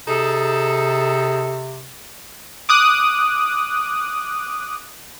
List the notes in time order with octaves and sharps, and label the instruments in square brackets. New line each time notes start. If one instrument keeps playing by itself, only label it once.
[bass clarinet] C3 [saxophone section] D#4 G#4 A4
[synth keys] D6 D#6 F#6